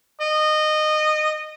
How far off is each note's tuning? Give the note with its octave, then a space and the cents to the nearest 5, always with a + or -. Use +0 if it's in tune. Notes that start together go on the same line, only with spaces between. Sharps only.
D#5 -20